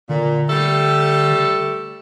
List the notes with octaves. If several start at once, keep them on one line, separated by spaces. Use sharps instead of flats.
A#2 D3
G3 A3 A4